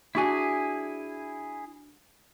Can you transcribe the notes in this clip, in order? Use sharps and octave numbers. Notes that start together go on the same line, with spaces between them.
D4 E4 F#4 G#4 G#5